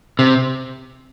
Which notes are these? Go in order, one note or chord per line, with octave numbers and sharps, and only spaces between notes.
C3